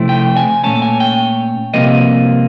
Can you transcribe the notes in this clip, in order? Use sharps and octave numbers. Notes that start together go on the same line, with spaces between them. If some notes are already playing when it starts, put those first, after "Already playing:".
Already playing: C3 F3 A3 C4 E4
G5
G#5
A#2 F#3 A3 C#4 A5
G#5
G5
C2 C3 F3 A#3 D#5